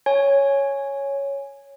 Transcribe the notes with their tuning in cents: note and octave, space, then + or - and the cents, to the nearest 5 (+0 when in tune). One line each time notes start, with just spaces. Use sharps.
C#5 +0 G#5 +0